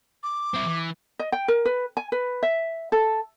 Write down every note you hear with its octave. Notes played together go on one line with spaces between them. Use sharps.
D6
C4 E4
E3
D#5
G5
A#4
B4
G#5
B4
E5
A4